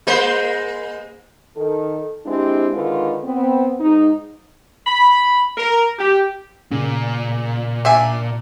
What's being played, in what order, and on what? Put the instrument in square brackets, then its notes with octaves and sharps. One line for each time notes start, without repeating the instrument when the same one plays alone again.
[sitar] G#3 A#3 C5
[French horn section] D#3 A4
G#3 C4 D4 E4 G4
D3 D#3 G#3 F4 B4
B3 C4
G#2 D#4
[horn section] B5
A#4
G4
[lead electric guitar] A#2 [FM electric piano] C#3
[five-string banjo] D4 E5 G#5